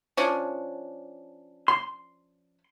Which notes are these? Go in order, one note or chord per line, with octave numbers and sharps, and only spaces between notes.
F3 C#4 D4
C6